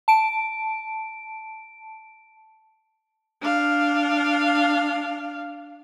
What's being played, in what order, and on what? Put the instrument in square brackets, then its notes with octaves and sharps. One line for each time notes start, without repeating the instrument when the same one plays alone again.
[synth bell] A5 D7
[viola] D4 F5